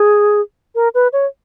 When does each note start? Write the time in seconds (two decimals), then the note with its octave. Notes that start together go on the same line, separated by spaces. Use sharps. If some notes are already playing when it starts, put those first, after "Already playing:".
Already playing: G#4
0.75 A#4
0.94 B4
1.13 C#5